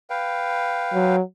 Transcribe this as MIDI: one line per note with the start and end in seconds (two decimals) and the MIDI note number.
0.10 1.16 71
0.10 1.16 77
0.10 1.16 79
0.94 1.21 54